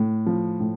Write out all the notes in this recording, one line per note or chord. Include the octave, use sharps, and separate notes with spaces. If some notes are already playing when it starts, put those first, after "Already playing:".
Already playing: A2
F3
A2